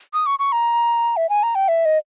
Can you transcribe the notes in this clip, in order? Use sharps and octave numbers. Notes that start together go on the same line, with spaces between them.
D#6
C#6
C#6
A#5
E5
G#5
A#5
G5
E5
D#5